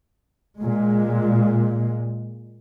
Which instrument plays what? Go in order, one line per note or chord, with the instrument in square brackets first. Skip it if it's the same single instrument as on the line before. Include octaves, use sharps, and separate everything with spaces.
[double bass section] A#2 G#3